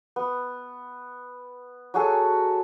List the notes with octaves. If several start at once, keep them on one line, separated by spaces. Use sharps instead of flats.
B3
F#3 F#4 G#4 A4